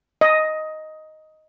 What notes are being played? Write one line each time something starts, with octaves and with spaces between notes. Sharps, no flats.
D#5